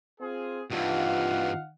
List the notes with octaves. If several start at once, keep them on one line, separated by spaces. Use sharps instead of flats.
C4 F4 G#4
G2 E3 D#4 F4 F5 F#5